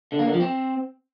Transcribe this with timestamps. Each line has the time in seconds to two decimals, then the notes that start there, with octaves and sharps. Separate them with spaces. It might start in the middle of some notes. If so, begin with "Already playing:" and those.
0.12 D3
0.19 A#3
0.26 D3
0.33 F3
0.40 C4